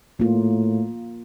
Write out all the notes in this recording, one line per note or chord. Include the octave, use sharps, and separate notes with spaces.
A2 A#3 F4